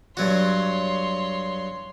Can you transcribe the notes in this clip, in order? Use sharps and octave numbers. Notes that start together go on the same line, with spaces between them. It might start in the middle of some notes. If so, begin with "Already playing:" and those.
G2 F#3 F#4 C#5 C6